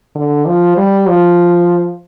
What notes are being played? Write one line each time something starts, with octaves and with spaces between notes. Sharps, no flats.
D3
F3
G3
F3